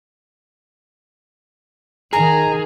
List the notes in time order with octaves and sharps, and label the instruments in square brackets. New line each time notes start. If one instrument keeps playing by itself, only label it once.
[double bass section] D#3 [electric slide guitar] G#4 [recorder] A#5